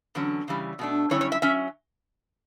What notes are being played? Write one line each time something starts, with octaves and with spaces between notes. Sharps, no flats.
E2 D3 F#3 C#4
C#3 E3 G3
B2 A3 D4
F#2 D3 G3 C#4 E4 C#5
C#5
E5
F#3 C#4 E5